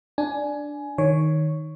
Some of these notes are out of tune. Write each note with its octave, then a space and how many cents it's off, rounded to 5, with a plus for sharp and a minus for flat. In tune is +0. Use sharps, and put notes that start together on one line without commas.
D4 +0 G#5 +15
D#3 +0 C#5 +0